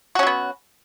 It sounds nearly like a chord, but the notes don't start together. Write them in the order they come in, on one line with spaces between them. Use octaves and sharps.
F#4 C#4 F#3 B3